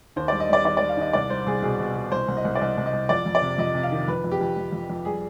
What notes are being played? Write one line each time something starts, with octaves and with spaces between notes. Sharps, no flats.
D#2 C5
D5
G3
D#5
G3 D5
D#3 D5
D5
G3
F5
D#2 D#5
C2 D5
G3 C5
C2 G#4
B2 G#4
B2
B2
C2 C5
C2
D#5
C2
D5
C2 D#5
C2
D#5
C2
F2 D5
F2
D5
C3
F2 D#5
C3
F5
D#3
F2 B4
F2
G4
F2
F2
F2
F2
G3 G#4